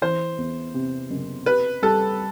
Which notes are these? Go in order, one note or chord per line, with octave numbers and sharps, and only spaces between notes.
E3 C5
E2
C3
F#1
G4 B4
G3 A4